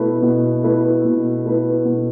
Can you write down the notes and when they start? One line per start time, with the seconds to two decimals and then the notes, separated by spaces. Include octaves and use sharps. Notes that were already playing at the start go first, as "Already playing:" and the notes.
Already playing: B2 A3 E4 B4
0.22 B2
0.64 A3 E4 B4
1.05 B2
1.46 A3 E4 B4
1.85 B2